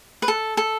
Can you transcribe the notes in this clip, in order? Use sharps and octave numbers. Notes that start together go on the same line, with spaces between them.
B4
A4
A4